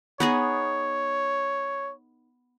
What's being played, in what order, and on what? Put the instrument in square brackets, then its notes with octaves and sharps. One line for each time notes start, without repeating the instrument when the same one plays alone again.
[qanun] B3 D#4 G#4 [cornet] C#5